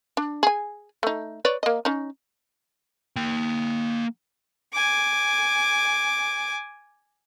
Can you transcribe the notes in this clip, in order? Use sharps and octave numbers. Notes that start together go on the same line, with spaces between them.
D4
G#4 G#5
A3 D#4
B4 C#5 D5
A#3 D#5
C#4 D#4
A#3 G5
G#5 D6